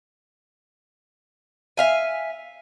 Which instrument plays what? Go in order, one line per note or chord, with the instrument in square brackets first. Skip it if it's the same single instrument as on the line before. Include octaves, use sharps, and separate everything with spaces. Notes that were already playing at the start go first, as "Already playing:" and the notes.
[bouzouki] E5 F5 G#5